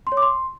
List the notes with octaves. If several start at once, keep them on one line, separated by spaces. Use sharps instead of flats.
C6
C#5
D6
C6